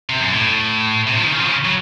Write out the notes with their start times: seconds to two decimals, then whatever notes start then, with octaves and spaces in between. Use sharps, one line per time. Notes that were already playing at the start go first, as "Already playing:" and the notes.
0.10 C3
0.20 F#2
0.32 A2
1.07 C3
1.16 F3
1.24 D#3
1.32 C#3
1.39 F3
1.48 C#3
1.65 F#3